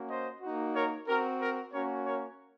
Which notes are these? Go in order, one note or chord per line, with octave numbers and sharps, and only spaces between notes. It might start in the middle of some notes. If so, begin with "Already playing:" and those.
Already playing: A#3 C#4 F#4
C5 D#5
A#3 D#4 F#4
A#4 C#5
C4 F#4 A#4
A#4
A#3 C#4 F#4 A#4 C#5
A#4 C#5